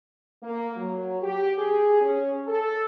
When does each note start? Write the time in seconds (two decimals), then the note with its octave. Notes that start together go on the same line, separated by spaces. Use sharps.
0.42 A#3
0.76 F#3
1.23 G4
1.58 G#4
2.02 C#4
2.47 A4